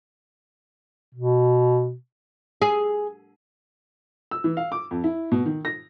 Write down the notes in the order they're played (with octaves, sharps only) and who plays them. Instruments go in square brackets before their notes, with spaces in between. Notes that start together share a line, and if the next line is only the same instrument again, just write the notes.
[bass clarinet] B2
[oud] G#4
[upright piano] E6
E3
F5
D6
F2
E4
B2
D#3
A#6